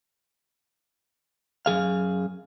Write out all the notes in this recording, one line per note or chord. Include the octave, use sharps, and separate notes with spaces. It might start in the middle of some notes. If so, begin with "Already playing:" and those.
F#2 E3 G#4 F5